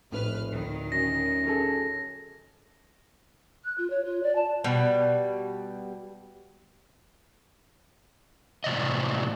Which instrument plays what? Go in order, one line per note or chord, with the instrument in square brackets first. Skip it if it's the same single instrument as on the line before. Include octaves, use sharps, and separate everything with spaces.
[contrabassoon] F1 [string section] A#1 B4 F6 [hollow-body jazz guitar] A2
[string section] D2 D#3
[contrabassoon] F#2 [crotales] A#6
[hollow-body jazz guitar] C#4 G#4 A4
[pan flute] F#6
F4
C#5
F4
D5
A5
[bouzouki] B2 G3
[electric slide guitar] A2 C3 D5 D#5